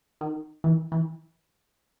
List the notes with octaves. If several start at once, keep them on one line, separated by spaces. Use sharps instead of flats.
D#3
E3
E3